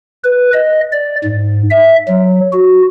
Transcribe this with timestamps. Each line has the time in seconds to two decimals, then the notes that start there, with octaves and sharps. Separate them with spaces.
0.24 B4
0.53 D#5
0.92 D5
1.24 G#2
1.71 E5
2.08 F#3
2.53 F#4